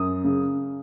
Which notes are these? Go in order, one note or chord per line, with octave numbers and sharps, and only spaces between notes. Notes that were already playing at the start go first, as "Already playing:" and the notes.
Already playing: F#2 D#6
C#3